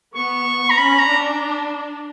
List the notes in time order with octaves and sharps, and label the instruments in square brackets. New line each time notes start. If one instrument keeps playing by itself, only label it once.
[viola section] B3 [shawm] C#6
[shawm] A#5
[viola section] C#4 [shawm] B5
[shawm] A#5
[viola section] D4